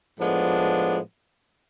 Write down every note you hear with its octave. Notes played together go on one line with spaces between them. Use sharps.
A2 F3 G#3 B3 D4